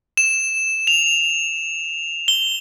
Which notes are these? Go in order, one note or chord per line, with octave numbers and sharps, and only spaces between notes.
E7
F7
G7